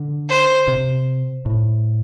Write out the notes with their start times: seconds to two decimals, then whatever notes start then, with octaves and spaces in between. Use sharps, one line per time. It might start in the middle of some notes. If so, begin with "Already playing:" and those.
Already playing: D3
0.29 C5
0.68 C3
1.46 A2